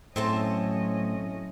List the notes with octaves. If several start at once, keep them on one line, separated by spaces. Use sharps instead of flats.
A2 F#3 C4 C#4 A4 D#5 A5